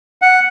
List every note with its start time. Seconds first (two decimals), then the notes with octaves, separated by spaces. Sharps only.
0.22 F#5